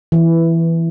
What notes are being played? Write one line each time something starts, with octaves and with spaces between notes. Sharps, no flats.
E3